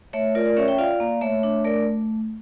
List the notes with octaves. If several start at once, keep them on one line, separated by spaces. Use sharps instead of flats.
A3 C#5 E5
F4 A#4 D5
A#4 D5
C#4 C#5 E5
E5 G5
F4 D5 F5
A#3
A3 C#5 E5
D4
A3 A#4 D5